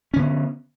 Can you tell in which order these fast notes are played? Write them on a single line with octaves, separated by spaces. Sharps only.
C#4 D3 B3